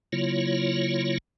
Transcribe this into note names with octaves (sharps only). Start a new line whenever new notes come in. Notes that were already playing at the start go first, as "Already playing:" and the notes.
C#3 F#3 A#3 E4 F4 C#5